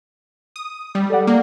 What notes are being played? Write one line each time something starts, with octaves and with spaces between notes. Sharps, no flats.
D#6
G3
A4 D5 F#5
A#3